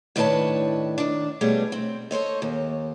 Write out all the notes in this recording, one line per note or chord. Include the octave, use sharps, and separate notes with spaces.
A2 D#3 D4 B4 C#5 A5
D#3 D4
B2 G3 A3 G#4 C#5
C4
A4 C5 C#5 D#5
D#2